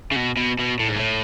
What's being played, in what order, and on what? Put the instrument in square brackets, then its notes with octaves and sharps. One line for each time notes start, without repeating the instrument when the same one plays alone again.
[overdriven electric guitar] C#3
B2
B2
B2
A2
G#2
A2